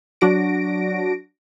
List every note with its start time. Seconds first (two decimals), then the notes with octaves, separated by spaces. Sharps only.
0.21 F#3 D4 F#4 A#6 D7